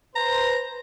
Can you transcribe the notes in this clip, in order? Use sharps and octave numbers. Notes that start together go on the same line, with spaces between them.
B4 C5 A#5